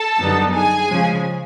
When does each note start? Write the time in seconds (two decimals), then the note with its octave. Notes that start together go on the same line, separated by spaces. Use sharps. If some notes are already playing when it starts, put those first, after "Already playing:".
Already playing: A4 A5
0.20 F#2 D3 G3 B3 D#4
0.54 G#4 G#5
0.90 C#3 F3 G#3